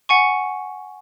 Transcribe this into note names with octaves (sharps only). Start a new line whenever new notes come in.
F#5 G#5 C#6